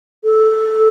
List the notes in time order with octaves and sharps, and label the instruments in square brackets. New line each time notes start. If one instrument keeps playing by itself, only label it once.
[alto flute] A4